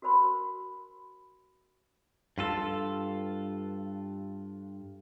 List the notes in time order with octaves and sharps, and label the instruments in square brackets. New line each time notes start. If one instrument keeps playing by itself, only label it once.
[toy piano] F#4 A#4 C5 B5 C6
[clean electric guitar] G2 F4 A4